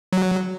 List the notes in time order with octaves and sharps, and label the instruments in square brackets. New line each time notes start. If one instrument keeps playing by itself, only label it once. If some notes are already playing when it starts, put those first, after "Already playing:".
[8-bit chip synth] F#3